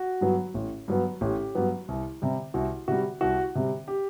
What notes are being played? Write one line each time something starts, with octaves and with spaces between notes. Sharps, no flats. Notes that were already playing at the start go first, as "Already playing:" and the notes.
Already playing: F#4
G2 F#3 B3
A1
G2 F#3 B3
A1 G4
G2 F#3 B3
C2
C3 G3
C2 F#4
C3 G3 F#4
C2 F#4
C3 G3
G4